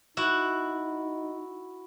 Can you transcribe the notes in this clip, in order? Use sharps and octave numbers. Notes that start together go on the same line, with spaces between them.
D#4 E4 F#4